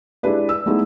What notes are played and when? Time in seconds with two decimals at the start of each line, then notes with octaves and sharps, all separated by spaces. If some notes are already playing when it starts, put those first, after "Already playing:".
0.23 G#3 D4 E4 G4 B4 D5
0.49 E6
0.66 G#3 A3 B3 D#4 E4